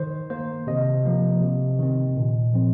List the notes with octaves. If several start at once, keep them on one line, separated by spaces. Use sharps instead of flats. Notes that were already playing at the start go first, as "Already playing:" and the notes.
Already playing: D#3 C5
A#3 C5
C3 D#5
F3 A#3
C3
D#3 C4
A#2
F3 C4